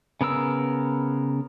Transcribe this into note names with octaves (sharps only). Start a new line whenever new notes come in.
C#3 B3 A#4 E6